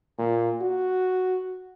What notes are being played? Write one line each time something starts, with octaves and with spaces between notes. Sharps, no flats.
A#2
F#4